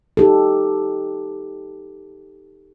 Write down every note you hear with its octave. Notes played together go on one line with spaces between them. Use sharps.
D#4 G4 A4